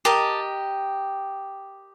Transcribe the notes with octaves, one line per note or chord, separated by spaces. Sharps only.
G4 A#4 D#5 A5